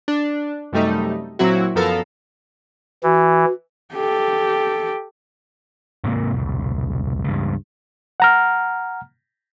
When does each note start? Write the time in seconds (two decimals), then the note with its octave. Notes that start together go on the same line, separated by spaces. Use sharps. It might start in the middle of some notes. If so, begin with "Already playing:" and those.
0.08 D4
0.73 F#2 C3 G3 A3 D#4
1.39 A#2 F#3 C4 E4 F#4
1.75 F#2 F3 B3 A4 A#4 F5
3.03 E3 F#4
3.94 G4 A4
6.04 G#2 C3 A#3
6.33 E1 C2
7.24 C#2 G2
8.20 F#5 A#5 F6